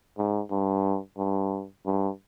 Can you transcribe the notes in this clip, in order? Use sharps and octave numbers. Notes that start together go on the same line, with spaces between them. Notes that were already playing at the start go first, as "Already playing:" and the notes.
G#2
G2
G2
G2